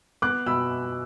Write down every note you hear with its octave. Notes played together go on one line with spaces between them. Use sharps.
B3 D6 F#6
B2 B5 E6